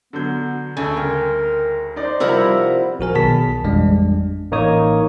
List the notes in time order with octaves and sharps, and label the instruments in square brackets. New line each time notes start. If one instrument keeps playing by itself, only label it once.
[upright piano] D3 F#3 G6 [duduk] B3
[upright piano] D2 G#5 [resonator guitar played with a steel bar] C#3 [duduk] A4
[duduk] A#4 [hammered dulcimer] G5 A#5 C6
[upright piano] D#4 D5 [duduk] C5
[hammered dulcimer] C3 F3 G3 [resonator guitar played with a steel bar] E4 A#4 F#5
[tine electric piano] A#1 F#4 A#4 G#5
B1 B2 D#3 G#4 A5 B6
A1 F2 G3 G#3 D4
A1 A#3 D#4 C#5 D#6